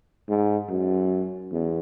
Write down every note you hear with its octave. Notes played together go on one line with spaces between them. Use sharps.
G#2
F#2
E2